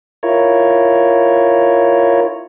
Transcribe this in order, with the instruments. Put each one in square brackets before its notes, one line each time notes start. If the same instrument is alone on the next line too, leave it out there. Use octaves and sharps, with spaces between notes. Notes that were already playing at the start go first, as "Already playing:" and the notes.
[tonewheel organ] E4 F4 A#4 C#5